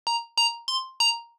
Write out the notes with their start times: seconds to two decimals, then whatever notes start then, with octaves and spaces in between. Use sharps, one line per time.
0.07 A#5
0.37 A#5
0.68 C6
1.00 A#5